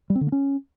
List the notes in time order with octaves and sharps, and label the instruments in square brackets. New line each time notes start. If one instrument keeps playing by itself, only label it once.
[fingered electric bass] G3
C4
D3
A#3
C#4